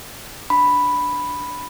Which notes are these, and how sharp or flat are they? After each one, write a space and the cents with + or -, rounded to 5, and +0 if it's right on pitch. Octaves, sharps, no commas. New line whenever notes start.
D4 +0 B5 +0